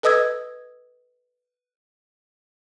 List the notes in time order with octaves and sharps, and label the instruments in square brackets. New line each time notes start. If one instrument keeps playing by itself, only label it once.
[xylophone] A4 B4 D#5 D#6 E6 G#6